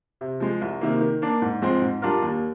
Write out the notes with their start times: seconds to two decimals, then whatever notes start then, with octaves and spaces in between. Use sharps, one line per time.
0.21 C3
0.40 F3 G#3
0.62 C2
0.81 C3 D#3 A#3
1.01 D#3
1.22 A#3 D4
1.42 G#2
1.62 F3 G#3 C4
1.82 G#2
2.02 G3 D4 F4 A#4
2.22 D#2